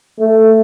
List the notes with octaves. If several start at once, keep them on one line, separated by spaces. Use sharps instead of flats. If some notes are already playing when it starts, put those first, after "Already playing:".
A3